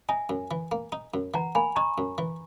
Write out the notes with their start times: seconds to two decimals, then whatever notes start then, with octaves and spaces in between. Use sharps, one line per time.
0.09 D#4 E5 G#5
0.29 F#2
0.51 E3
0.72 A#3
0.92 D#4
1.14 F#2
1.34 E3 F#5 A#5
1.55 A#3 G#5 B5
1.76 D#4 A#5 C#6
1.98 F#2
2.18 E3